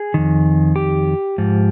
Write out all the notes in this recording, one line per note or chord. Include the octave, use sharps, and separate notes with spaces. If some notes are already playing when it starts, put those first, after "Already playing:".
Already playing: G#4
F2 D#3
G4
G#2 F3